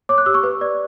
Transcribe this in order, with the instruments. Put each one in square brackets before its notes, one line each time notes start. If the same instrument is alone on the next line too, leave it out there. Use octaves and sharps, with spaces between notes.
[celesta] C#5 D6
F#6
G4 E6
C#6
B4
D5